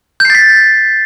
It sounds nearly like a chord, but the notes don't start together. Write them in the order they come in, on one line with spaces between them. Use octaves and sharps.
G6 C7 A6 B6